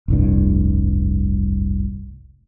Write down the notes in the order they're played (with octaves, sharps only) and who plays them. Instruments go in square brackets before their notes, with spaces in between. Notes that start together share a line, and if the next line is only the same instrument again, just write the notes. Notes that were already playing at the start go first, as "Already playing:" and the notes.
[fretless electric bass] F1 C2 G2